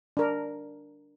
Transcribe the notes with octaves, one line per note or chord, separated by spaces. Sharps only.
D4 A#4